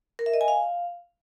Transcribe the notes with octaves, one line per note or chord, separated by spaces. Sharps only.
A#4
E5
D#5
G#5
F5